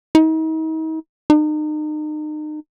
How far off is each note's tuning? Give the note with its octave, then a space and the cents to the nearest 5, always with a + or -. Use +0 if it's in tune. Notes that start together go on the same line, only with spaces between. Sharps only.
D#4 +40
D#4 -35